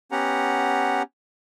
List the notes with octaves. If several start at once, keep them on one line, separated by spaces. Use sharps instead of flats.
B3 C#4 G4 F#5 A#5